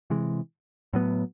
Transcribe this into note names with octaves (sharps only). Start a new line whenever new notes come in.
C3 E3 G#3
A2 F#3 B3